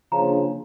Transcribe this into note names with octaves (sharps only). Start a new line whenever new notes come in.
C#3 F3 A#3 D4 A#5